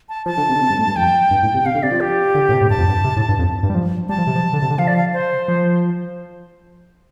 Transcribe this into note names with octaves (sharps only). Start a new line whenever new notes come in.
A5
F3 A5
D3
C3
D3
C3
G2
A2
G2
F2 G5
G2
A2
C3
C3 F5
D3
C3 D5
F3
G4
D3
A2
C3
A2
G2 A5
F2
G2
C3
A2
G2
F2
G2
G3
F3
G3 A5
F3
C3
F3
D3
C3
D3
F3 F5
D5
F5
C5
F3